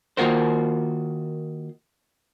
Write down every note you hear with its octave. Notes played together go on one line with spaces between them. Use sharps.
D#3 A#3 F4 F#4 A#4 C5